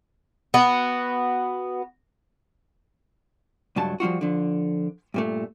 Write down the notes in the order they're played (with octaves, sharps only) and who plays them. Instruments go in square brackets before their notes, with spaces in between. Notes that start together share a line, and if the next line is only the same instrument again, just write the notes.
[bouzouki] B3 F#4
[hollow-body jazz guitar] C#2 G2 F#3 A5
F3 G3 F4 F#4
D3 F3
G2 A#2 A3